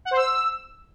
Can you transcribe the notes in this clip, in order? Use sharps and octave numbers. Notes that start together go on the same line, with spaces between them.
F#5
C5
E6